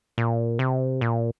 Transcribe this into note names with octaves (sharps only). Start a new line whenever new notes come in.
A#2
C3
A#2